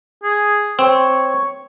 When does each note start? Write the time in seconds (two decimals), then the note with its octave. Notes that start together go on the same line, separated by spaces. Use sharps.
0.23 G#4
0.79 C4 C#5